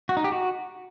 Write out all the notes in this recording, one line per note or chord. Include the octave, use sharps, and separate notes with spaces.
F#4
D#4
G4
F#4